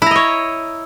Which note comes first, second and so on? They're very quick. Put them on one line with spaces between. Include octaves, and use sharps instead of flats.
E4 A#5 D#5 C#5